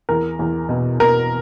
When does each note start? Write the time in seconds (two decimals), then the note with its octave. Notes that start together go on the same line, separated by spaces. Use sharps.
0.09 E2 A#4
0.39 E2
0.69 B2
0.99 B2 A#4